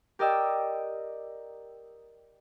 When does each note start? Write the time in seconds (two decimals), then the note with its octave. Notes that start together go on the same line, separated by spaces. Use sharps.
0.19 G4 A#4 D5 D#5 G5 E6